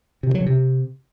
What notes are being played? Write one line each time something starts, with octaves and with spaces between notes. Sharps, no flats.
C3
D#3
F#3
C#3
C3